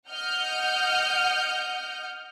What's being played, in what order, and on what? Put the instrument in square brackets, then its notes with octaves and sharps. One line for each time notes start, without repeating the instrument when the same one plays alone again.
[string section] D#5 F#5 F6 G6